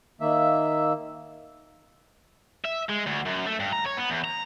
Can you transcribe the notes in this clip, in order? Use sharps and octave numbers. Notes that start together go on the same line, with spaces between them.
D#3 A#3 E5
E5
G#3
D2
F#2
A3
G2
A#5
C#5
B3
E2
A#5